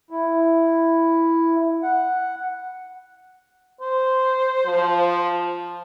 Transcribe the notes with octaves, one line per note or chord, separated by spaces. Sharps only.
E4
F#5
C5
F3